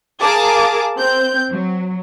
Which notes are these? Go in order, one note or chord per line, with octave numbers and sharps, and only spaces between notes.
G#4 A#4 F5 A5 D6
C4 G6
F#3